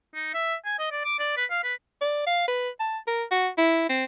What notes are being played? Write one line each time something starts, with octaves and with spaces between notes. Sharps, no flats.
D#4
E5
G#5
D#5
D5
D6
D5
B4
F5
B4
D5
F5
B4
A5
A#4
F#4
E4
C4